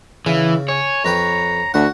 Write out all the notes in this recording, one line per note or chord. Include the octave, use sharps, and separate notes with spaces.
C#3 E3
C#5 G#5
F2 B4 G5 A#5
D2 F#4 F#5